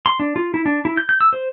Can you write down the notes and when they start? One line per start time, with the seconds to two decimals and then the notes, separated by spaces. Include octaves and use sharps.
0.06 C6
0.20 D4
0.36 F4
0.54 E4
0.66 D4
0.85 E4
0.97 G6
1.09 G6
1.21 E6
1.33 C5